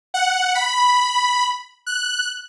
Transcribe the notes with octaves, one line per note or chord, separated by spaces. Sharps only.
F#5
B5
F#6